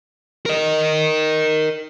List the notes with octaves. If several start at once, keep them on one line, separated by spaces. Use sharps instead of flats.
A#4 D#5